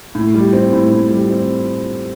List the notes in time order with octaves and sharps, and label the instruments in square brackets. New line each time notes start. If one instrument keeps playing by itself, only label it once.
[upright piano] A2
G3
C4
A2
A2
G3
C4